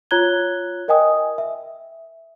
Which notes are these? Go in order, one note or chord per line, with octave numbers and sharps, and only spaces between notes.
F4 C#5 A#5 F#6 G#6 G7
A#4 D#5 G5 G#5 D#6
E5